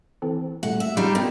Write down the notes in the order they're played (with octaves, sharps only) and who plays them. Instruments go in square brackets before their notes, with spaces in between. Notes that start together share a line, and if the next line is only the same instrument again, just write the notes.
[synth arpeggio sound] E3 C4 A4
[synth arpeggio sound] A#2 G3 A3 [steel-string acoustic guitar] F#5
[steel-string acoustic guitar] E5
[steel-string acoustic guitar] G3 D4 D#4 [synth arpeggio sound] G#3 F4 F#4
[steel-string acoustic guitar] B2 [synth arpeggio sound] A#4 C5 G5